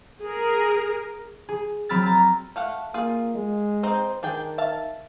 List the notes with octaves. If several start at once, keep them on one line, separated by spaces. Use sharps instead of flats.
G#4 A#4
G#4
F#3 C4 B5 E6 F6 A6
A#5 A6
A3 F5 F#5
A#3 F4 G#4 F5
G#3
C4 D#4 C5
D#3 D4 G#4 G5
E5 F5 A5